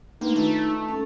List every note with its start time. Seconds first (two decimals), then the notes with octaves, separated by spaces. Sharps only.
0.21 A3 A#3 D4 D#4 B4
0.36 D#3 A3 F4
0.88 C#4 A4